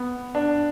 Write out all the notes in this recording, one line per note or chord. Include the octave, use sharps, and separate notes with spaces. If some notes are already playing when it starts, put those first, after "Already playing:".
Already playing: B3
D4